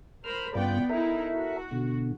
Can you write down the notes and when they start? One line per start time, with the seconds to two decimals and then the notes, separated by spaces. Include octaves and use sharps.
0.24 A#4 C5 B5 F6
0.55 G2 C#3 B3 F4 D5 G5
0.89 D#4 E4 A4 A#4 E5
1.32 F#4
1.71 B2 D3